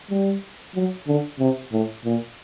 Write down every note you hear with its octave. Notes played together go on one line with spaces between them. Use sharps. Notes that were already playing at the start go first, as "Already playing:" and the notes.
G3
F#3
D3
C3
A2
A#2